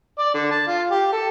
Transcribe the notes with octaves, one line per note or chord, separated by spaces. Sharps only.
D5
D3
A5
F4
G4
A4